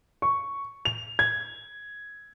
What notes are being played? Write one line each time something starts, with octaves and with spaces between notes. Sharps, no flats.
C#6
F7
G#6